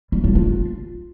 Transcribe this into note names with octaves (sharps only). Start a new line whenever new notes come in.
G3
F4
F4